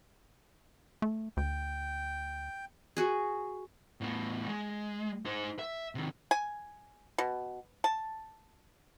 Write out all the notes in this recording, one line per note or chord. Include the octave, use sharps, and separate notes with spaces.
A3
D2 G5
F#4 G#4
A2 B3
G#3
D#4 C5
E5
C3 D#3
G#5
B2
A5